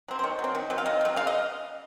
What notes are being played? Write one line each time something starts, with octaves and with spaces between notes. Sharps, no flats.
F#3 C4
C5
D#3 C#5
F#3
C4
D#3
F#3 C4
F5
D#3 D#5
F#3 C4
C#3 F5
D#5